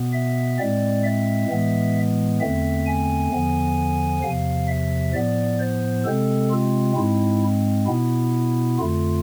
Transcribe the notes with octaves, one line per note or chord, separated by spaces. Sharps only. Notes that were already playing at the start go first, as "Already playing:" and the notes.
Already playing: B2 B3
E5
A2 G#3 C4 D5
E5
A2 E3 G#3 B3
E2 D3 A3 C4 E5
G#5
E2 D3 F3 B3
E2 C3 F3 F5
E5
A2 F3 B3 D5
C5
C3 G#3 C4 A4
F4
G#2 G#3 C4 E4
B2 B3 E4
F2 D3 A3 F4